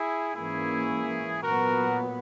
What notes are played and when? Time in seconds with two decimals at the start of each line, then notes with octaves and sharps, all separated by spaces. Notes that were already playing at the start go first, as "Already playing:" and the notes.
Already playing: E4 G#4
0.34 G#2 E3 A#3 C#4 E4 G#4
1.43 A#2 F#3 B3 F#4 A#4